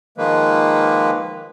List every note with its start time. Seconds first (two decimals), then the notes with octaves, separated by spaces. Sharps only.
0.18 D#3 F3 G#3 A#3 B4